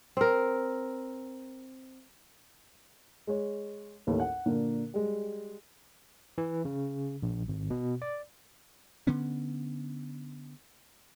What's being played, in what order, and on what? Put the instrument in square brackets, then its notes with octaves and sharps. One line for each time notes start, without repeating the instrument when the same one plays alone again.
[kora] C4 A#4
[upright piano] G#3 C#5
A1 D#2 A4 C#5
F#5
A#2 D3 A#3
G3 G#3
[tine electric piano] E3
C#3
A#1
G#1
B2
D5
[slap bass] D3 B3 C#4